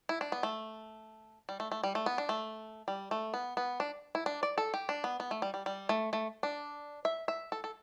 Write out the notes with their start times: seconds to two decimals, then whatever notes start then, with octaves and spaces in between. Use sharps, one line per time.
0.09 E4
0.21 D4
0.32 B3
0.43 A3
1.49 G3
1.60 A3
1.72 A3
1.83 G3
1.95 A3
2.06 B3
2.18 D4
2.29 A3
2.88 G3
3.11 A3
3.34 B3
3.57 B3
3.80 D4
4.15 E4
4.26 D4
4.43 D5
4.58 A4
4.74 G4
4.89 D4
5.04 B3
5.20 B3
5.31 A3
5.42 G3
5.54 G3
5.66 G3
5.89 A3
6.13 A3
6.43 D4
7.05 E5
7.28 E5
7.52 A4
7.64 A4